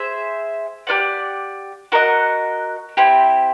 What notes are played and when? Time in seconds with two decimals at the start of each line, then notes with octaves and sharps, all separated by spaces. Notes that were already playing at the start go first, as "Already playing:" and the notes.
Already playing: G#4 C5 E5
0.87 G4 B4 D5 F#5
1.92 F#4 A#4 D#5 F#5
2.97 C4 E4 G4